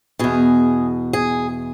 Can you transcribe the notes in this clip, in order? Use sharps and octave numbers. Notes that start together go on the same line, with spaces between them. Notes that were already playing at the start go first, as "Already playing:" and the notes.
E2 B2 G#4
G#4